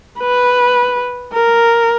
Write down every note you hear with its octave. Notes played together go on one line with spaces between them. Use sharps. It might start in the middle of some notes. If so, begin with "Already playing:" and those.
B4
A#4